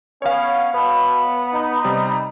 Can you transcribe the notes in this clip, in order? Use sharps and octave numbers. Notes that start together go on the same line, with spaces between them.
B3 C#4 C#5 F5
B2 B3 B5
D#4
C3 G3